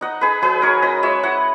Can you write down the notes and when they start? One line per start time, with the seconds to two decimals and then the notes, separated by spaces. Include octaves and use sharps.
0.01 D#4 D#5 F#5
0.21 D#4 G#4 B4
0.42 F#3 G#4 B4
0.62 D#4 A#4 C#5
0.82 C#4 B4 D#5
1.03 G#3 C#5 E5
1.23 E4 D#5 F#5